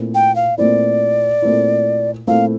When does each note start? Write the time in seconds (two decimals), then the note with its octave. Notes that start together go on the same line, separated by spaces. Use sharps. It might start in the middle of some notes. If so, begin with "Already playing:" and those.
Already playing: A#2 A3 C4 E4
0.15 G5
0.36 F5
0.58 A#2 A3 C4 E4 D5
1.42 A#2 A3 C4 E4
2.27 A#2 A3 C4 E4 F5